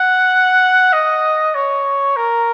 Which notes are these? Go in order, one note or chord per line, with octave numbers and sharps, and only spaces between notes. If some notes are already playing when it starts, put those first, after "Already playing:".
Already playing: F#5
D#5
C#5
A#4